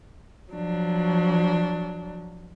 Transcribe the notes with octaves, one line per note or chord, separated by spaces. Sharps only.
F3 F#3 D4